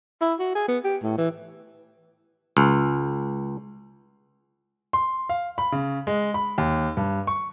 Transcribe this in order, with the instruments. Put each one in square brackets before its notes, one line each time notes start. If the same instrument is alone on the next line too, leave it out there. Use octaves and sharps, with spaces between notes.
[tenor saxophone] E4
F#4
G#4
B3
G4
A2
E3
[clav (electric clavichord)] C#2
[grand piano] C6
F5
B5
C#3
G#3
B5
D#2
G2
C#6